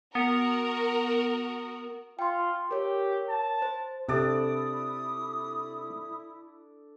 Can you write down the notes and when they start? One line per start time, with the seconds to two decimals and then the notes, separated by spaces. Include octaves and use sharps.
0.15 B3 F#4 A#4
2.19 F4 G5 C6
2.71 G4 A#4 C#5
3.29 A5
3.62 C5
4.09 C3 D4 E4 A4 D5 D#6